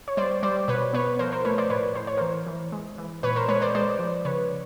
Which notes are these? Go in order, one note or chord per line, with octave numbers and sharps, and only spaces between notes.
C#5
G3 C5 D5
G3 C5 D5
B2 B4 C#5
B3 B4 C#5
F3 A#4 C5
A#4 C5
A3 B4 C#5
C5 D5
A2 B4 C#5
A2 C5
C#5
E3 A#4 C5
E3
G#3
E3
A#2 B4 C#5
A#4 C5
G#3 B4 C#5
C5 D5
G#3 C5 D5
F3
C#3 B4 C#5